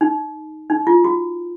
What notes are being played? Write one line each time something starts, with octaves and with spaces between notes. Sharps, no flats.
D#4
D#4
F4
F#4